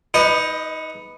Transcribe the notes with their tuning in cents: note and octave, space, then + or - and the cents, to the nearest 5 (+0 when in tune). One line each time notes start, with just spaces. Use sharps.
D#4 +20 B4 +5 D#5 -30